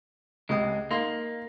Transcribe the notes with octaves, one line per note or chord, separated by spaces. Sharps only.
C#2 C3 G#3 D#6
A#3 D#4 F5 C6